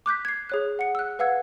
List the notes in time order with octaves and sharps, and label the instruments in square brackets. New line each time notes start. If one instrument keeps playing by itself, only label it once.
[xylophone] D6 F#6 G6 B6
G#6 C7
G#4 C#5 F#6
F#5 C#7
E6 F#6
B4 F5 F#5 E6 G#6